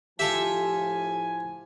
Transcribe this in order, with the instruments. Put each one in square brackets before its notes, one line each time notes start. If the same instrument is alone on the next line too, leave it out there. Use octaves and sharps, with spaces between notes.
[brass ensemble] A2 F3 G#5 [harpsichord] F4 A4 E5 [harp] G4